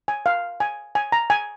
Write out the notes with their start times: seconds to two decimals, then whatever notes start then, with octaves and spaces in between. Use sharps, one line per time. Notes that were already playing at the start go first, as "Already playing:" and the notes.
0.08 G#5
0.26 F5
0.60 G#5
0.95 G#5
1.12 A#5
1.30 G#5